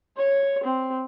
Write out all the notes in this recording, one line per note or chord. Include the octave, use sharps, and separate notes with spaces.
C#5
C4